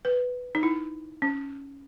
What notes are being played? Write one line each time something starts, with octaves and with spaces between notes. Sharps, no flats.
B4
D#4
E4
C#4